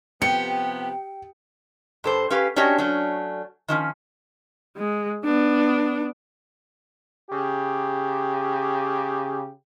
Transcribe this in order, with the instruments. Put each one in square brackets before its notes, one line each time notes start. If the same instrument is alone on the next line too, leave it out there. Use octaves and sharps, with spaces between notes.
[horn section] C3 F3 B3 [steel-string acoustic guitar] G4 [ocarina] G5 [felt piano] C#7
[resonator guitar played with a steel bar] G2 A4 C5
C#4 G4 B4 F5
C#4 D4 F#4 G4 C#5 D#5
F#3 A3 C#4 D4
D#3 F3 C#4
[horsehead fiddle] G#3
B3 D4
[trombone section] C#3 G4